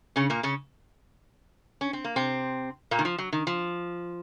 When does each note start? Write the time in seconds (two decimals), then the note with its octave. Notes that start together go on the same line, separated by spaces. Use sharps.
0.16 C#3 C#4
0.30 A#2 A#3
0.43 C#3 C#4
1.81 C#4
1.93 C4
2.04 A#3
2.16 C3 C4
2.91 A#2 A#3
2.99 D#3
3.05 F3
3.18 F#3
3.32 D#3
3.47 F3